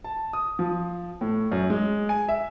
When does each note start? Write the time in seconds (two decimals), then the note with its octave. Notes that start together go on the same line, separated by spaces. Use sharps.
0.04 A5
0.33 D#6
0.59 F3
1.21 A2
1.52 F#2
1.70 G#3
2.09 G#5
2.29 E5